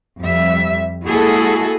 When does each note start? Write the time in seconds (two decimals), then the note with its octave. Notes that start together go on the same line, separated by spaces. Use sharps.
0.21 F2 G3 E5
1.05 G#3 A#3 E4 F#4 G#4 A4